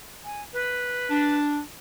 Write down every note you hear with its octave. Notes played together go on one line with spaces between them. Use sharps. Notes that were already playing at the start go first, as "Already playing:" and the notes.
G#5
B4
D4